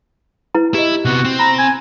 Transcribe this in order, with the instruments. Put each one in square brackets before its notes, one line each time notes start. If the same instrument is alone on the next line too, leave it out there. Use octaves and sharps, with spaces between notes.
[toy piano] E4 B4 A#5
[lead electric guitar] E4 [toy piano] G4 D#5
[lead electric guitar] C3 B3 [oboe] F#4
[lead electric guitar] C4
[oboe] A#5 [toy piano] B5
[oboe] G#5